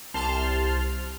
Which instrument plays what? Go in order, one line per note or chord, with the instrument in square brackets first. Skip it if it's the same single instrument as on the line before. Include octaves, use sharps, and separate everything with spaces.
[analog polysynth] C2 C3 A5 C6 F6 G6